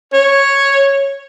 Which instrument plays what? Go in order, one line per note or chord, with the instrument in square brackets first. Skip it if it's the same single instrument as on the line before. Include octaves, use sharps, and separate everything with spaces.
[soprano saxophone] C#5